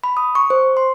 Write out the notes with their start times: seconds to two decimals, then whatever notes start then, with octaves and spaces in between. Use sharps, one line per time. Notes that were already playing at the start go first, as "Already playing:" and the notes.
0.04 B5
0.17 D#6
0.35 C#6
0.50 C5
0.77 C6